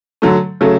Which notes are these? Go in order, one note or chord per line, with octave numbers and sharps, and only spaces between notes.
D3 F#3 A3
C#3 F#3 A3